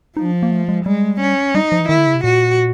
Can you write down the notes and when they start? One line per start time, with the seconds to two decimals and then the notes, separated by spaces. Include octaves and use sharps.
0.16 F3 D#4
0.25 D4
0.43 A#3
0.51 A3
0.68 G#3
0.85 G3 G#3
1.20 C#4
1.54 G3 D#4
1.72 F3
1.80 E3
1.89 D#3 E4
1.98 D3
2.06 C#3
2.15 C3
2.24 A#2 F#4